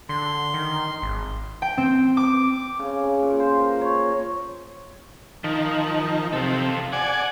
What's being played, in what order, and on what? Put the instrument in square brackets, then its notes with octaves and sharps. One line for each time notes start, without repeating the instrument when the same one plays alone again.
[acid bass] D3 [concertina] C6
[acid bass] D#3
G#1
[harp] G5
C4
D6
[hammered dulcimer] C#3
C#3
A#2
C5
A#4
C#5
[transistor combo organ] D#3 [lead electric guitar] F3
[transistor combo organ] C3 [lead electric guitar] F4 A4
[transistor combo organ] D5 G#5 [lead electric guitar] F#5